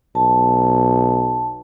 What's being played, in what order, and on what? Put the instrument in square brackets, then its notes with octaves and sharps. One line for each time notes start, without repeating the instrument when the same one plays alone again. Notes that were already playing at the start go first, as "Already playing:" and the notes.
[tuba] B1 [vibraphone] A5